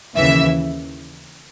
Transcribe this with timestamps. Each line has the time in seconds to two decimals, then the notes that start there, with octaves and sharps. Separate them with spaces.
0.16 D#2 C#3 E3 E5